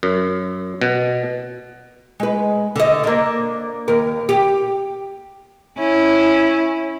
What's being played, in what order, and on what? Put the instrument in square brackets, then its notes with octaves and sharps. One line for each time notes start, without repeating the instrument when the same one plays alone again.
[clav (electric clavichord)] F#2
B2
[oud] G#3 B4
D3 D#5
A#3 D4
D#2 A#4
G4
[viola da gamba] C#4 E4